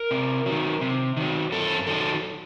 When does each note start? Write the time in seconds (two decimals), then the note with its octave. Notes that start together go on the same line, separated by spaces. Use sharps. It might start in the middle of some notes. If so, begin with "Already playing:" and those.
Already playing: A#4
0.11 C3
0.46 D#3 F#3
0.81 C3
1.17 D#3 F#3
1.52 F#2 A4
1.87 D#3 F#3 A4